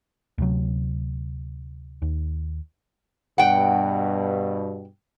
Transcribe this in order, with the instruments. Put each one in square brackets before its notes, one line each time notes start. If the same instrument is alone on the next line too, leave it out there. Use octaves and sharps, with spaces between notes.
[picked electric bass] D2 C3 F#3
D#2
[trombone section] G2 B2 [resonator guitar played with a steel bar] F#5 G5